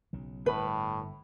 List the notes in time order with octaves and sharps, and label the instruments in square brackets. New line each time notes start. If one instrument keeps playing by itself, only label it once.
[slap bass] B1 C#3
[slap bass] G1 [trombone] A2 [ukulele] B4